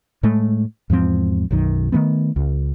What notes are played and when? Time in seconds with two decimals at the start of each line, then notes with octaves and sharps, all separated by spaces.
0.23 A2 G#3 A3
0.90 E2 G#2 F3 C4
1.51 B1 F#2 D#3
1.92 D#3 E3 A3 B3
2.36 C#2